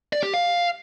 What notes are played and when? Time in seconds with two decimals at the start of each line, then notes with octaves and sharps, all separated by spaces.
0.13 D5
0.23 G4
0.34 F5